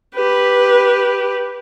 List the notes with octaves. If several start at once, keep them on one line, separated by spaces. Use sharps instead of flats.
G4 B4